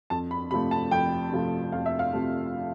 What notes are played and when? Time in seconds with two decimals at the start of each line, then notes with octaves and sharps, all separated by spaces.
0.10 F2 A5
0.31 B5
0.51 C3 F3 A3 B5
0.71 A5
0.91 F2 G5
1.33 C3 F3 A3
1.72 F2 F5
1.86 E5
1.99 F5
2.13 C3 F3 A3